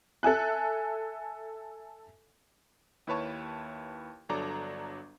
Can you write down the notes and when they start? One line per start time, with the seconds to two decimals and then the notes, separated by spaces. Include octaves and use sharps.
0.23 A4 E5 G#5 F#6
3.07 D#2 E4 B4 C#5 A5 C#6
4.29 G1 F#3 D4 A4 A#5 D6